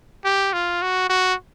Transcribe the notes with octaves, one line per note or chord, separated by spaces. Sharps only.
G4
F4
F#4
F#4